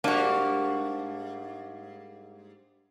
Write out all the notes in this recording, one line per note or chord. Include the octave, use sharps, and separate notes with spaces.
G#2 G3 A#3 D4 F#4